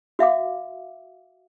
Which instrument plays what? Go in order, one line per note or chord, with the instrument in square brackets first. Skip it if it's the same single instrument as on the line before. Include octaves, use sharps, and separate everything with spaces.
[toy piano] F#4 E5 F5 D6